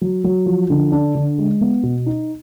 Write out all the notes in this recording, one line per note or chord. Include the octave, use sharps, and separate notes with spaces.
F#3
F#3
F3
D3
D4
D3
G#3
B3
B2
D#4